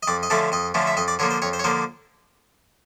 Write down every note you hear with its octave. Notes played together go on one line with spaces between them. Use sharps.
D#5
F2 D5
D#5
D3 F3 A3 C#4 D5
F2 D#5
D3 F3 A3 C#4
E5
F2 D#5
D5
D3 F3 A#3 C#5
C5
F2 C#5
C5
C#5
D3 F3 A#3 C5